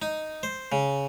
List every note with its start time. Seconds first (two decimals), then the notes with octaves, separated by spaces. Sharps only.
0.02 D#4
0.43 C5
0.72 C#3